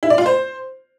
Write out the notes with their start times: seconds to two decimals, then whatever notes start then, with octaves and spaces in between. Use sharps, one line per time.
0.03 E4
0.10 D5
0.18 F4
0.26 C5